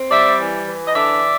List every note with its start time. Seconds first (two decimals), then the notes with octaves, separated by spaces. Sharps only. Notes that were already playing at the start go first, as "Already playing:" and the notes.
Already playing: C4
0.10 G3 D5 E5
0.39 E3
0.67 E3
0.87 D#5
0.94 D3 D5 E5